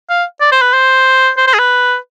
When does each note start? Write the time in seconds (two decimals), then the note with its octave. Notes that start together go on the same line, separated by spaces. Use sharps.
0.10 F5
0.41 D5
0.52 C5
0.62 B4
0.73 C5
1.37 C5
1.47 C5
1.54 G#4
1.59 B4